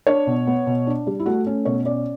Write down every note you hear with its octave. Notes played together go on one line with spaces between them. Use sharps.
D4 C#5
B2
B3
B2
D4
G3
E4
A3 F#4
C#4
B2 C#5
C#4 D5